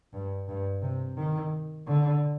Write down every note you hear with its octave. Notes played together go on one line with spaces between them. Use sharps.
G2
G2
C3
D#3
D3